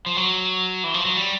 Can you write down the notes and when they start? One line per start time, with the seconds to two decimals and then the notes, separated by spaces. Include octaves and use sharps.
0.06 F3
0.17 F#3
0.84 E3
0.94 F3
1.05 F#3
1.16 G3